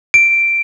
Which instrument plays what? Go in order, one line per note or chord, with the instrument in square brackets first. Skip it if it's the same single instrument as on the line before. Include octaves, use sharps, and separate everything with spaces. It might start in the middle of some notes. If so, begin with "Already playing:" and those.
[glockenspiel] D7